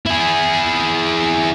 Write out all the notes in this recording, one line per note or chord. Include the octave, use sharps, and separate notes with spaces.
E4 G#4